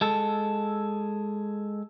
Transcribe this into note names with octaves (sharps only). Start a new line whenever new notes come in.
G#3 A4